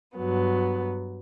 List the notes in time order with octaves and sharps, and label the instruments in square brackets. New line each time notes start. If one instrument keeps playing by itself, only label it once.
[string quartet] G2 F#3 B3